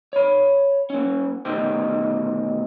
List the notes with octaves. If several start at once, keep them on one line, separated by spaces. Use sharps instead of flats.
C#5 B5
A#3 C#4
D2 B2 D#3 D#4 G4 C5